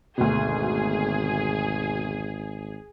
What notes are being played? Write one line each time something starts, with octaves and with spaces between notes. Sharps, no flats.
G#1 D2 B2 G#4